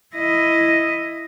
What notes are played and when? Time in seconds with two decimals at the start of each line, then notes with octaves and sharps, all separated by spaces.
0.15 E4 D#5